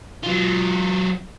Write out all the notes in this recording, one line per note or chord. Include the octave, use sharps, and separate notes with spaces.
F#3 F4